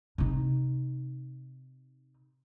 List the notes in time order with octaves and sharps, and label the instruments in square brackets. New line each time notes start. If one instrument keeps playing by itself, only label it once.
[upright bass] C3 D#4